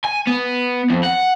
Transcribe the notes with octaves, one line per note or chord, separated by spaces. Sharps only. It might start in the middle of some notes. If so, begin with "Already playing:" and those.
G#5
B3
F2
F#5